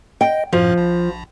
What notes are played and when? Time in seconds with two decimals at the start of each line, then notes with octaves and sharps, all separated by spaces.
0.21 D#5 G5
0.53 F#2 A2 F3
0.78 A#1